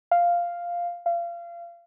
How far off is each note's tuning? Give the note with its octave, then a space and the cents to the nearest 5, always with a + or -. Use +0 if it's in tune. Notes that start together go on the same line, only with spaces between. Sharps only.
F5 -5
F5 -30